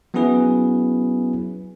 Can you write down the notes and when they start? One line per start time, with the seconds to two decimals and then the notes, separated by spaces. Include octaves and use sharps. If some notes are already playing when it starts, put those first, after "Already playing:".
0.14 F#3 B3 C#4 E4 G#4 B4